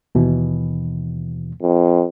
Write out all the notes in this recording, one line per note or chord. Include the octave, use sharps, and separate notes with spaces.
D#2 B2 E3
F2